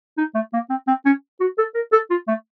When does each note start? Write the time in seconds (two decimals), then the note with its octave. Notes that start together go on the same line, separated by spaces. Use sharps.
0.18 D#4
0.35 A3
0.53 A#3
0.70 C4
0.87 C4
1.06 C#4
1.40 F#4
1.58 A4
1.75 A#4
1.92 A4
2.10 F4
2.28 A3